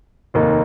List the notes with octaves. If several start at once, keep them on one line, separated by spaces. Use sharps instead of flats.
F1 D#2 D#3 A#3 D#4